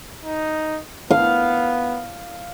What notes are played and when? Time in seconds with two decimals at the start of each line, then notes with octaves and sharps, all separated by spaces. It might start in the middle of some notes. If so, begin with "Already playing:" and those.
0.24 D#4
1.11 B3 F5